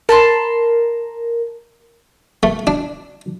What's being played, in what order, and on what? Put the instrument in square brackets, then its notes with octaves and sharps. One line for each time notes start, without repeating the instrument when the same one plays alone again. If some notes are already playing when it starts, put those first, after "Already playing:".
[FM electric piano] A#4 [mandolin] A5 B5 C6
[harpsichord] A3
D4